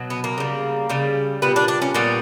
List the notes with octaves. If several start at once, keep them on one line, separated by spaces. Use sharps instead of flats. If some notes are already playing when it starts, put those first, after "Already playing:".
Already playing: B2 F#3
B3
A#3
C#3 G3
C#3 G3
A#2 G3 B3
D4
D4
C#4
A#2 G3 B3